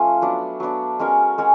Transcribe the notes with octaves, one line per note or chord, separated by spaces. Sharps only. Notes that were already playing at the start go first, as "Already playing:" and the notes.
Already playing: F3 A3 C#4 F4
F#3 B3 D4
F#3 B3 D4
G#3 C#4 F#4 A#4
G#3 C#4 F#4 A#4